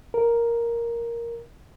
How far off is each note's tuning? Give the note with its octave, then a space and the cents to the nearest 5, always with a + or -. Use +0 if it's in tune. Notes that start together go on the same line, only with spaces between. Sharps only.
A#4 +5